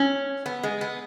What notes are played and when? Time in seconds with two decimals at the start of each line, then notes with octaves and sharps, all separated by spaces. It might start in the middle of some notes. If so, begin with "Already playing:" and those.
Already playing: C#4
0.46 B3
0.63 G#3
0.81 B3